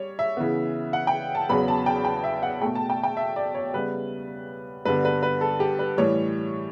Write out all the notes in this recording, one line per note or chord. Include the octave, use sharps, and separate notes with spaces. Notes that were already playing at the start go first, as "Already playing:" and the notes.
Already playing: G3 C#5
E5
C#3 E3 B3
F#5
G5
A5
E2 C#3 F#3 B3 B5
A5
G5
G5
E5
F#5
B2 A3 G5
A5
G5
G5
E5
D5
C#5
C#3 G3 B3 B4
G2 D3 G3 B3 B4
B4
B4
A4
G4
B4
A2 E3 G3 C#5